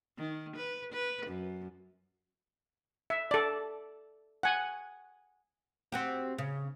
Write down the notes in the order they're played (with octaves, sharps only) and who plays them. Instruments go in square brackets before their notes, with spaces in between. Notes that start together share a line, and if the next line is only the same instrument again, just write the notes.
[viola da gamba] D#3
B4
B4
F#2
[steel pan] E5
A4 D5
F#5 G#5
[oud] C4 F#4 G4
C#3